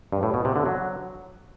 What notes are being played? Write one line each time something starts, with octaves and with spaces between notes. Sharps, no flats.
G2
A2
B2
C3
D3
F#3